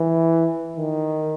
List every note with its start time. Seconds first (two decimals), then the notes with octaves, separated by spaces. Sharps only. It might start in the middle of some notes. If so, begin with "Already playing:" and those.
Already playing: E3
0.77 D#3